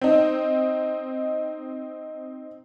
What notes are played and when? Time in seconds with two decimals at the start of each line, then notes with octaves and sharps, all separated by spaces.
0.01 C4 D#4